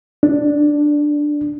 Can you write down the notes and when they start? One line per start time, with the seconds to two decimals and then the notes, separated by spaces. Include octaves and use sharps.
0.23 D4